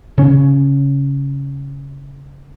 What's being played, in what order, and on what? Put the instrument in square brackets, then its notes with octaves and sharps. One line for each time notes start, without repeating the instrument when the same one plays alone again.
[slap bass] C#3 C#4